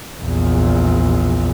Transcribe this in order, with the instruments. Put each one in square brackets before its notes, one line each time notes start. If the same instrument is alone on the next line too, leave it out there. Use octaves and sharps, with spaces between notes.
[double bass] A#1 E2